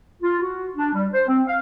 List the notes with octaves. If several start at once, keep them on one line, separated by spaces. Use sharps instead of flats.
F4
F#4
D4
G3
C5
C4
F5